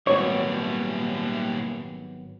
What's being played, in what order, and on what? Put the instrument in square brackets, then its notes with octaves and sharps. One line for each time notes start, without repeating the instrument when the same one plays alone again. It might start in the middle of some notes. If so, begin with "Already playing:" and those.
[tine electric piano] G#1 F#3 B3 [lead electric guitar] A#2 G3 [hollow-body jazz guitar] C#5